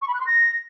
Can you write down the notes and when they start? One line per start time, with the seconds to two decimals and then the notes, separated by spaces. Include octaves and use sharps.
0.02 C#6
0.08 B5
0.14 F#6
0.20 C6
0.27 A#6